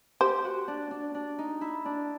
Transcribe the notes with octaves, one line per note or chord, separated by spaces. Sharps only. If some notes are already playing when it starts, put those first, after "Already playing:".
G4 C5
F#4
D4
D4
D4
D#4
E4
D4